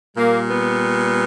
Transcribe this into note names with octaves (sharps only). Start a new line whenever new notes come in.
A#2 G3 A#3
B3